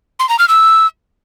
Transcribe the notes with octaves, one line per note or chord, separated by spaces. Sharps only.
C6
A#5
F6
E6